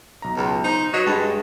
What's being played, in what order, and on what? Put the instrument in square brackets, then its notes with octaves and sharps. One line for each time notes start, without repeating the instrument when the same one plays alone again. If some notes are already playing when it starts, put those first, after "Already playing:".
[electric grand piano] B1 A#5
[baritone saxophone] C#2
[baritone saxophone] D#4 [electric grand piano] C5
[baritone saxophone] F#3 [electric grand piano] B4 D#5 C#6
[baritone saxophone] G2 [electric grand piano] G#3 A6